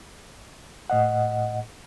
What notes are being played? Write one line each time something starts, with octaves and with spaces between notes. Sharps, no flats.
A2 D#5 F#5